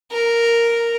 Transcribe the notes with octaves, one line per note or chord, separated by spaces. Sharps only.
A#4